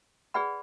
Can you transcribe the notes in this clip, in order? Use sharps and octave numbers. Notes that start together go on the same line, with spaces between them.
G#4 B4 D5 F#5 B5